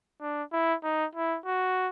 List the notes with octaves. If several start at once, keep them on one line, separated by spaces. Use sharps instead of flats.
D4
E4
D#4
E4
F#4